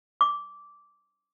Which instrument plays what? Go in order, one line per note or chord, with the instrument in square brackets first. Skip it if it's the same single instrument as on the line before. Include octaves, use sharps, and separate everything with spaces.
[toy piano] D6